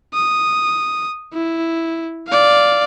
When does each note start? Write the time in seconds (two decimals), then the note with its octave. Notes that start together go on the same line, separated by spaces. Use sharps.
0.14 D#6
1.33 E4
2.28 D5 F5